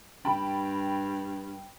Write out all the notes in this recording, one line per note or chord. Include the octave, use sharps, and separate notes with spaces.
G2 G5 A5 B5